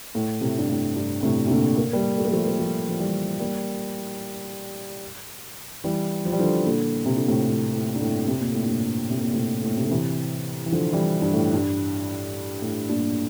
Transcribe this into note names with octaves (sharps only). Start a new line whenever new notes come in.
A2
A2 C3
G2
A2
G2
A2 C3
C3
A#2 D3
A#3
G3 A#3
A3
A#3
F3 A3
A#3
F3 A3
F3
E3 G3
G3 A#3
E3 G3
F3
G3
D3 F3
A#2 D3
C3
D3
A2 C3
A2
A2
G2
A2
C3
A#2
A2
G2 A#2
C3
A#2
A2 C3
A2
A#2
C3
D3
C3 E3
E3
D3 F3
E3 G3
G2
A2
G2
A2
G2 A#2